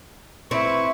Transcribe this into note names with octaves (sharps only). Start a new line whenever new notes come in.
C4 E4 B4 C#6